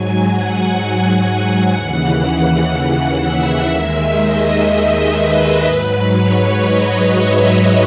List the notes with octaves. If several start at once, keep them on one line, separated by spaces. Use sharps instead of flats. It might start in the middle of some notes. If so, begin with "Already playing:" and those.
Already playing: G#2 F#3 G#5
F#5
F#5
D#2 C#3 E3 F#5
E5
D#2 D#3 G#3
D#5
B4
G#2 F#3
C#5
D#5
E5